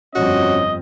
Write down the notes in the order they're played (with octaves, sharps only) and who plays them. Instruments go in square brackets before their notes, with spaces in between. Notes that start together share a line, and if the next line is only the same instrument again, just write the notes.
[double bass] G1 F2 [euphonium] C#4 [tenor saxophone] F#4 [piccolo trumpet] D#5